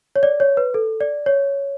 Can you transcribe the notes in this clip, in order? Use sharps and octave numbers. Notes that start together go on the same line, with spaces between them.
C#5
D5
C#5
B4
A4
D5
C#5